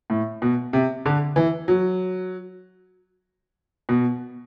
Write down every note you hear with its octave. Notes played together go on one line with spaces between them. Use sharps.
A2
B2
C3
D3
E3
F#3
B2